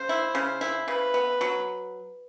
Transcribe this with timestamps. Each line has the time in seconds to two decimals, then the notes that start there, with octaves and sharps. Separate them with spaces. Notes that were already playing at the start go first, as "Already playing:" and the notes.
Already playing: C#3 C5
0.09 E4
0.35 C#3
0.61 E4
0.88 C#3 B4
1.14 B3
1.41 F#3